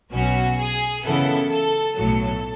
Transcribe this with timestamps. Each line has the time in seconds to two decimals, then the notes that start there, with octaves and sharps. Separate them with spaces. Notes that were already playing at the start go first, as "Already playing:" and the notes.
0.12 B1 B2 F#3 C#4 F#4
0.58 G#4
1.03 F#2 C#3 E3 B3 E4 A4
1.49 A4
1.95 B1 A2 F#3 A4